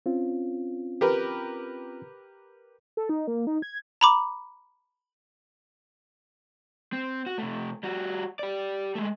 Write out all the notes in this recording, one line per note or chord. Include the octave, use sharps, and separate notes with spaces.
C4 C#4 F4
G4 A#4 B4
A4
D#4
A#3
D#4
G#6
A#5 B5 D6
C4
F#4
C3 A3
G3 F#4
G4 D5
G#3 A3